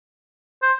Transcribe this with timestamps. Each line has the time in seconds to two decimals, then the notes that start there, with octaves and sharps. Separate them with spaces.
0.62 C5